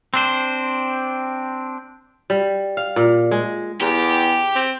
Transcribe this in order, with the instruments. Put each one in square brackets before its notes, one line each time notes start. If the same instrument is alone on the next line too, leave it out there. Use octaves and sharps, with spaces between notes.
[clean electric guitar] C4 D4 C5
[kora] G3
F5
A#2
G#3
[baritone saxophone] E2 [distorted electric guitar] G4
[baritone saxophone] C4